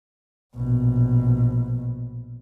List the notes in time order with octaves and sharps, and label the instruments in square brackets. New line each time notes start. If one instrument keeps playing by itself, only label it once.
[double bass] A#1 B2